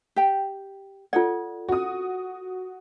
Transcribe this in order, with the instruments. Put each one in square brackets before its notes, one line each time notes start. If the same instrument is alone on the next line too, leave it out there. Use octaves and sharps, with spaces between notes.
[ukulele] G4 G5
[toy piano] F4 A4 D5 [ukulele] F#5
[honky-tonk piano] F#4 D#6